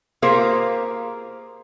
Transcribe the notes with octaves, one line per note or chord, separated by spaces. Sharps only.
A#3 F4 G4 G#4 A#4 C5